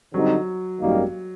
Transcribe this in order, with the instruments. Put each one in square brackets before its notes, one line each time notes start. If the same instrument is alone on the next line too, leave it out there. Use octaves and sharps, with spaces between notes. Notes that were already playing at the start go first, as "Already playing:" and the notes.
[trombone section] D3 G3 C4 D#4 [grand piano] F#3
[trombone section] G#1 F#2 D#3 G3 A#3